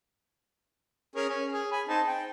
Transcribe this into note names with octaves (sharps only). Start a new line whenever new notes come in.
C#4 G#4 A#4
C#4
G#4
G#5 B5
C4 D#4 A5
G5